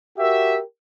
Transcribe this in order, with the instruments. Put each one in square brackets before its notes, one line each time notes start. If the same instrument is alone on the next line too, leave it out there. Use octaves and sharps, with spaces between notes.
[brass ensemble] F#4 G4 A#4 E5